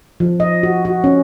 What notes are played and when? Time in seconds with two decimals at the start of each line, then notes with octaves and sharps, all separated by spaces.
0.20 F3
0.40 D#5
0.63 F#4
0.85 F#4
1.04 C#4